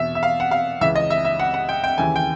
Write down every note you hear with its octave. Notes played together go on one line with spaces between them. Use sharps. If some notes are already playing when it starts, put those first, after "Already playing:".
Already playing: E2 B2 E5
E5
F5
F#5
F5
C#2 C#3 E3 E5
D#5
E5
E5
F#5
F#5
G5
G5
D#2 C#3 E3 G#5
G5